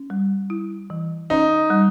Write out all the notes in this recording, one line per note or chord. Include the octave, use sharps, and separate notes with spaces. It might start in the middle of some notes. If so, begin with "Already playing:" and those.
Already playing: C#4
G3
E4
E3
C#4 D#4
G3